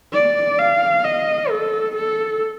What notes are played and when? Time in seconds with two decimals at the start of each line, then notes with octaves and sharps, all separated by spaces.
0.14 D5
0.59 F5
1.04 D#5
1.50 A4
1.95 A4